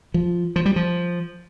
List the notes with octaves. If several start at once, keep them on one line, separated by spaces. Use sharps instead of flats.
F3
F3
G3
F3